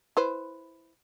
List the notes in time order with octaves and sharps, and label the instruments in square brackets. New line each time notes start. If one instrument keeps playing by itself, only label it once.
[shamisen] E4 B4 C5